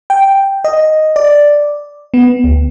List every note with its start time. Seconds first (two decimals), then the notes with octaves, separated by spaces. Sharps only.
0.10 G5
0.64 D#5
1.16 D5
2.14 B3
2.44 D2